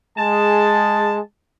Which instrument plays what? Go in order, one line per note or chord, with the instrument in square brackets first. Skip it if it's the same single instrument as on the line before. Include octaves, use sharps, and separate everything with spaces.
[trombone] G#3 [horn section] G#4 A5